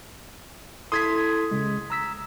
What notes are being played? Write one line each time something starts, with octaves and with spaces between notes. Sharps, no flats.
E4 A4 C6 D#6 G#6 B6
C#3 G#3
A#5 E6 B6